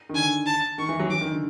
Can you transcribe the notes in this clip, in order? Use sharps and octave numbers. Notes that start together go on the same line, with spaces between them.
D#3
D3 G#5
A5
D#3 C#6
E3
F#3
E3 D6
D#3
D3